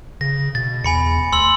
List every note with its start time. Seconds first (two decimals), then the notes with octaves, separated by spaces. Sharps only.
0.21 C#3 A#6
0.55 B2 A6
0.84 E2 G#5 B5 C#7
1.32 D2 C6 E6 F#7